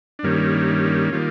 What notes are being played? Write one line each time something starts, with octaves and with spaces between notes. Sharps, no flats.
D4
G2 D#3 G3 A#3 C#4
D#3 G3 A#3 F4